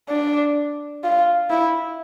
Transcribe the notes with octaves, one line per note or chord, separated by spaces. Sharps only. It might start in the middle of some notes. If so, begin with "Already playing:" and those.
D4
F4
E4